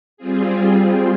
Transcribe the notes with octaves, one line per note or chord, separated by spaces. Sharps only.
G3 C4 F4 G#4